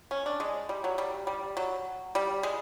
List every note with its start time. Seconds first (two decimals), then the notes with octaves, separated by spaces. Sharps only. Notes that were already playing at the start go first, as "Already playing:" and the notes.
0.11 C#4
0.26 D4
0.40 G#3
0.69 G3
0.84 F#3
0.98 G3
1.27 G3
1.57 F#3
2.15 G3
2.43 G#3